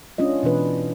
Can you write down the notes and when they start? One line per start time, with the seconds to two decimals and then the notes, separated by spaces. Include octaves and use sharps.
0.18 G#3 C#4 D4 F4 D#5
0.43 B2 E3 D4 B4